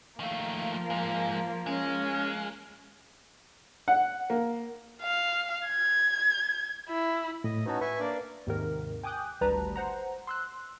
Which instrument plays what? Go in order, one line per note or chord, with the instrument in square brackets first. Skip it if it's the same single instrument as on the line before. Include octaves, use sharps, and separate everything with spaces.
[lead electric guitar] D#3 A3 [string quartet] F3 A#3 [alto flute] F5
[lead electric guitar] G#2 G#3
[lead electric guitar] G#3 [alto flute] C#4
[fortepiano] F#5
A#3
[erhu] F5
G#6
E4
[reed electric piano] A2 [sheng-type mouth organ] D#5
[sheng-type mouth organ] C#4 D#4 F#4 [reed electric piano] B4 F#5 A5
[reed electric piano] B4 [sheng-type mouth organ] E5 G#5 C#6
[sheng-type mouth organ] A#3 D4 D5
[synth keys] D#2 G#2 C3 D#3 A#4
G5 G#5 D6 D#6 F#6 G6
G#1 D2 G3 B4 A5 A#5
C5 F#5 A#5
C6 E6 F#6